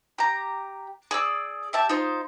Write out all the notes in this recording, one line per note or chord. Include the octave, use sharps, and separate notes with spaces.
G4 A#5
G#4 D5 E6
G4 E5 A5
D#4 F4 C5